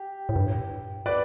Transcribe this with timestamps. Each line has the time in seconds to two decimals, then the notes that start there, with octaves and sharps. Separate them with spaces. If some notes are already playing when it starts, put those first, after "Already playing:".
Already playing: G4
0.29 A2
0.36 G2
1.06 B4 D5